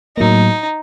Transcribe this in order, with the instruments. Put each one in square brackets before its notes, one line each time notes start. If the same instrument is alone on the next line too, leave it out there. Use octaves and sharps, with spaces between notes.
[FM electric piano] A2 F#3 A#3 [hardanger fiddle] D#4